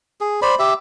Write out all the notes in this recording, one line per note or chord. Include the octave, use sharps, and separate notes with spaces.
G#4
C5 D5 B5
G4 E5